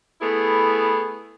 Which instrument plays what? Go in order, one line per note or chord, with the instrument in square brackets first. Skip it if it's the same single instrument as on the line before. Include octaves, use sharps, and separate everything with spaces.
[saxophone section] A3 B3 E4 G#4